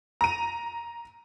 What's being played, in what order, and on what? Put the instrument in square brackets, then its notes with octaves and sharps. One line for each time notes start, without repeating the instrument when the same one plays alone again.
[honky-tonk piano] A#5 D#7